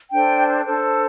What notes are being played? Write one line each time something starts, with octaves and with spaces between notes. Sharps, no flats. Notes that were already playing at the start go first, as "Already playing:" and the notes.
D4 A4 C5 G5
D4 A4 C5